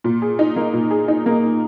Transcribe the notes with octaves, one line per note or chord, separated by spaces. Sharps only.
A#2
G#4
D#4
A#3
A#2
G#4
D#4
A#3